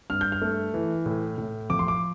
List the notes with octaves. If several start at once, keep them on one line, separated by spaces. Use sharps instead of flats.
G2 F6
G6
F6
A3
E3
A2
A2
F3 D6
C6
D6